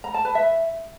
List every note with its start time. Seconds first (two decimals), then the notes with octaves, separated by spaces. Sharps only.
0.04 A#5
0.14 A5
0.25 B4
0.35 E5